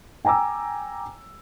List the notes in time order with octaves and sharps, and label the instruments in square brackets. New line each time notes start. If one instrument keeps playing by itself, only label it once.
[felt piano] G5 G#5 A#5 D6 E6